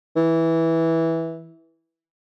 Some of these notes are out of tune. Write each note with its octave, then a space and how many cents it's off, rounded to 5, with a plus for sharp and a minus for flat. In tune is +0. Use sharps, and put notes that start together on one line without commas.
E3 -10